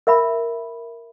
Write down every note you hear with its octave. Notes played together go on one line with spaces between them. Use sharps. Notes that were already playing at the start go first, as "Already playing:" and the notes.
A#4 E5 B5